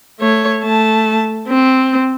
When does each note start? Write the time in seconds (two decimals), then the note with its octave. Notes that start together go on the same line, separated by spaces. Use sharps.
0.20 A3 C#5
0.62 A3 A5
1.48 C4